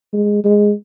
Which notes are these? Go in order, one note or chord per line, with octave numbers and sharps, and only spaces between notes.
G#3
G#3